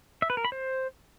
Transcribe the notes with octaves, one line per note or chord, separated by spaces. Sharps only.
E5
B4
A#4
B5
C5